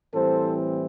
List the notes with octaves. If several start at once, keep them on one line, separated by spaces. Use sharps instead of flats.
A2 E3 G3 C4 A4 C5